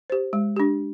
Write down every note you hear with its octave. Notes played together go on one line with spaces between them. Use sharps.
G4 C5
G#3
D4 G4